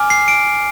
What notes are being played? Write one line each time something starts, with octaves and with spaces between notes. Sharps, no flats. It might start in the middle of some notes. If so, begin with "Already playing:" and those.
Already playing: G#5 D6 F6
C7
D7